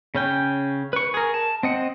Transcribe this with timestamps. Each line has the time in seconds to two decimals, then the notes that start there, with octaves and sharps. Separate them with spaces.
0.15 C#3 C#4 G5
0.93 B4 C#6
1.14 G#4 A#4
1.34 A5
1.63 C4 D#5 F#5